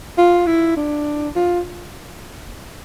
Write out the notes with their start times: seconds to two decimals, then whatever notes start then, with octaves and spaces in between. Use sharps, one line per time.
0.18 F4
0.46 E4
0.76 D4
1.35 F4